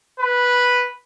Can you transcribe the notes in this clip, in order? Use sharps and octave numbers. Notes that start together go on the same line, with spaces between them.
B4